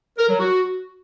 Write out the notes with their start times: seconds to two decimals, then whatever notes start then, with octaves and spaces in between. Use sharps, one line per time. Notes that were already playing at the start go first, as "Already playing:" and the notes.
0.18 A#4
0.29 F#3
0.39 F#4